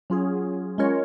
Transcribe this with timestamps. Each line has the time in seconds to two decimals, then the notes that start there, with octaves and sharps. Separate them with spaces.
0.10 F#3 C#4 F4 G#4
0.78 G#3 C#4 F4 A#4 C#5